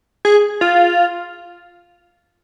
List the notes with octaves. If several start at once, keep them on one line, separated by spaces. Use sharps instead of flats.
G#4
F4